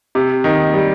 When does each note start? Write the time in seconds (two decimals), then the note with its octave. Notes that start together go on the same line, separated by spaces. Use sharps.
0.15 C3
0.44 D#3
0.74 G3